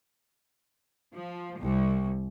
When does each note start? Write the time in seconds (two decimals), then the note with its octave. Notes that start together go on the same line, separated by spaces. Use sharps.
1.14 F3
1.60 C2